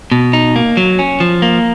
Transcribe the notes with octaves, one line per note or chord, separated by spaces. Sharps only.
B2
D#4
A#3
F#3
C#4
F3
A#3